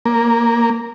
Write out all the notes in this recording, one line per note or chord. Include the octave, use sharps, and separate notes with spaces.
A#3